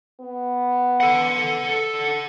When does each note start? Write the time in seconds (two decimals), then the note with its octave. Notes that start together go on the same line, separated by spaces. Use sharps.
0.20 B3
1.00 A4 F#5